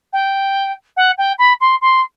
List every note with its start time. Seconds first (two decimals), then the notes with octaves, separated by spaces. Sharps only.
0.13 G5
0.97 F#5
1.18 G5
1.39 B5
1.61 C6
1.81 C6